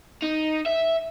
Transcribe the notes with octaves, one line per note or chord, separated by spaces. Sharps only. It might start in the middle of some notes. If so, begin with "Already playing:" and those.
D#4
E5